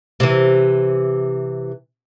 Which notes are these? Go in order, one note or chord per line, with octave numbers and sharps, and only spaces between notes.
C3 E3